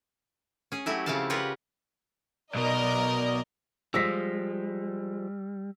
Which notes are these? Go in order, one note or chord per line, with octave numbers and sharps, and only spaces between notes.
C#4 G#4
F#3 A3 E4 F#4 G4
C#3 F3 C4 E4 F5 A5
F4 G4 A#4 B4 C#5 F#5
B1 B2 A#4 D5 D#5
F3 G3 G#3 E6 A#6 B6